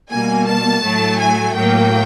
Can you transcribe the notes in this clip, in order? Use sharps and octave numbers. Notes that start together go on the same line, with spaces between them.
B2 G3 A#3 G#5
A5
A2 F#3 A3
G#5
A2 F#3 A#3 G5